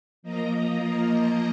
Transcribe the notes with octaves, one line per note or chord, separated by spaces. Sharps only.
F3 A#3 D#5 A#5